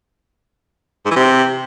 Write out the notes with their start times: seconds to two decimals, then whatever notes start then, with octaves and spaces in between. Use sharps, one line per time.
1.05 G#2
1.11 E3
1.16 C3